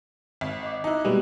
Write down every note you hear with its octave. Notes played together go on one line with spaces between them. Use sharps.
G#1
D#5 D6
D#4 E4 A#5 F#6
B2 G3 G#3 A#3 F#4 B4